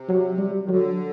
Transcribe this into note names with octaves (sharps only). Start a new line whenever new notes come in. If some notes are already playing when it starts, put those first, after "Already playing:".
Already playing: C3
F#3
G3
D#3
D3 F#3